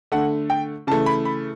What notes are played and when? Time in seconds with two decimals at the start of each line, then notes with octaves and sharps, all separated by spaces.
0.12 D3 A3 F#5
0.50 G5
0.87 C#3 E3 A3 A5
1.06 B5
1.25 B5